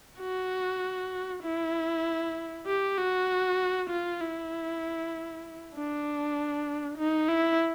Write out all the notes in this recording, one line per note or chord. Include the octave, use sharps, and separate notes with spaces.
F#4
E4
G4
F#4
F4
E4
D4
D#4
E4